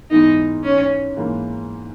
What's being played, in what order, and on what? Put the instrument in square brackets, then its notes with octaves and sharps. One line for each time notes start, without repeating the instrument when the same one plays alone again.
[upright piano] G#2 E3 B3 [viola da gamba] D#4
[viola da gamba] C#4
[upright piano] G#2 E3 A#3